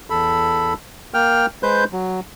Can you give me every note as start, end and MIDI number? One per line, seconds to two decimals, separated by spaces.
0.10 0.73 40
0.10 0.73 69
0.10 0.73 83
1.14 1.46 58
1.14 1.46 79
1.14 1.46 89
1.63 1.84 56
1.63 1.84 71
1.63 1.84 72
1.63 1.84 91
1.92 2.20 54